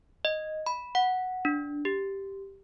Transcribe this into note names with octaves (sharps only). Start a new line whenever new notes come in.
D#5
B5
F#5
D4
G4